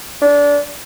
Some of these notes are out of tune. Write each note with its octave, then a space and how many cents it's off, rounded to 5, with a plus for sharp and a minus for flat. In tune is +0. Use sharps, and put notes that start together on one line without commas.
D4 -25